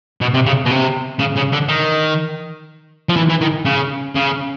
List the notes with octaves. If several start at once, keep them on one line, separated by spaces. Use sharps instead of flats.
B2
C3
C#3
B2
C3
C#3
C#3
D3
D#3
F3
E3
E3
D#3
C#3
C#3